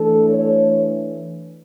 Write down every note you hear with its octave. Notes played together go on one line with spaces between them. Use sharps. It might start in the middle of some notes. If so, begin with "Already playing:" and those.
Already playing: E3 A3 D4 A4
C#5